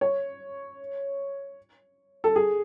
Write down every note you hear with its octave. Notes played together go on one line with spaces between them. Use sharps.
C#5
A4
G#4